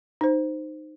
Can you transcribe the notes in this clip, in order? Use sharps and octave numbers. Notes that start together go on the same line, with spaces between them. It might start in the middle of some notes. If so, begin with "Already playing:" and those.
D#4 C5